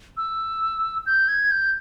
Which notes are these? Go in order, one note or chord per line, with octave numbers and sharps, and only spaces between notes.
E6
G6
G#6
G6